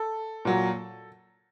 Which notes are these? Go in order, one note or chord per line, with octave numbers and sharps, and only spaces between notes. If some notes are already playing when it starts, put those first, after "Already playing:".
Already playing: A4
A#2 F#3